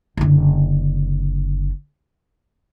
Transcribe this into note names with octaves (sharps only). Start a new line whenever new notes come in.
F#1 D3